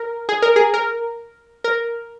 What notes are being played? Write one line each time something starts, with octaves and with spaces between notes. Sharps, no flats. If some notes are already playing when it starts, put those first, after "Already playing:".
Already playing: A#4
G#4
A#4
G#4
A#4
A#4